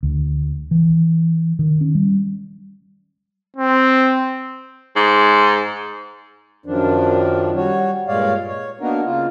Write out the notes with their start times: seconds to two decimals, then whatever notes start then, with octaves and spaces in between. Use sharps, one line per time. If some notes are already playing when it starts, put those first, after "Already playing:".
0.03 D2
0.71 E3
1.59 D#3
1.81 C#4
1.95 G3
3.57 C4
4.96 G#2
6.66 F#2 D#3 F3 D4
7.56 G3 F#4 C#5
8.08 G2 A#2 G#3 C#5 D5 F5
8.47 C#5
8.81 A#3 B3 D4 D#4 F#4 A#4
9.05 C#3 A#3 F4